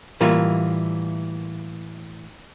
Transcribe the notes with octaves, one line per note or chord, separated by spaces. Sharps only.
A2 E3 G3 A#3 F4